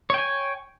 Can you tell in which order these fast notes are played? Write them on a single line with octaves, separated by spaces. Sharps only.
C#5 G5 G#5